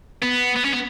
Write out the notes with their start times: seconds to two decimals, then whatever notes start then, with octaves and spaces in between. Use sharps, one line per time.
0.22 B3
0.56 B3
0.65 C#4
0.73 B3